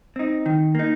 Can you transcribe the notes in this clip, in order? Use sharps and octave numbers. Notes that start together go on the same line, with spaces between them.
C4 D#4
D#3
A#3 D#4